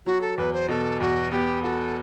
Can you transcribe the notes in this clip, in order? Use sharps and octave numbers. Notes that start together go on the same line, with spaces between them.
F#3 F#4
A4
E2 B4
C5
B2 A4
E2 F#4
B3 G4
F#4 A4